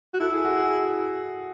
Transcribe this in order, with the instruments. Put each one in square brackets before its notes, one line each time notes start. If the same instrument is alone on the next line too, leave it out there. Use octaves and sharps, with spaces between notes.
[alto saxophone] F#4
[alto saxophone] E4 [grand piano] A4
[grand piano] G#4
F#4
G#4